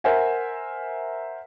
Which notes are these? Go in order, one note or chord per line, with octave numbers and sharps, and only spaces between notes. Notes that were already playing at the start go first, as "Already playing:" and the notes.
A#4 C5 E5 F#5 G#5